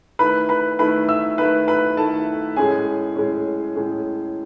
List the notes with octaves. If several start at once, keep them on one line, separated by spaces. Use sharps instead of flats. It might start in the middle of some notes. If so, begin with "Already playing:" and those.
D#3 A3 E4 B4 B5
B4 B5
D#3 A3 E4 B4 B5
E5 E6
D#3 A3 E4 B4 B5
B4 B5
D#3 A3 E4 A4 A5
A2 G#3 C#4 G#4 G#5
A2 G#3 C#4
A2 G#3 C#4